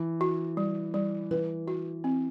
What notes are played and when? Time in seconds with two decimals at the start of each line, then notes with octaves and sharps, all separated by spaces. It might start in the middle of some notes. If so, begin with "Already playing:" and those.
Already playing: E3
0.21 F#4
0.57 G3
0.94 G3
1.31 E3 B4
1.68 F#4
2.04 C4